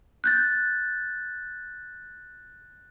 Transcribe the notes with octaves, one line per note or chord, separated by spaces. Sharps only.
F#6 G6 A6